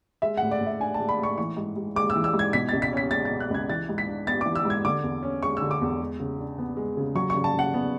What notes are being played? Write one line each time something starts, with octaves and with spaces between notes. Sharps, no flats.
G#3 E5
A2 F#5
D5
A2
E5
D4 G#5
A5
G#3
B5
A2 C#6
E3 C#6
G#2
G#2
G#3 D6
E6
E3
E6
G#2
G#6
B2 B6
C#2 A6
B6
C#4 B6
G#3 A6
A6
B2
F#6
C#2 G#6
E3 A6
G#2
B6
D4
B3 A6
E3 D6
E6
G#2 G#6
D3 D6
E2
C#4
G#3 C#6
D3 E6
D6
E2
G#3
C#3
D4
B3
G#3
C#3
F#3 C#6
C#3 C#6
A5
C#3 F#5
B3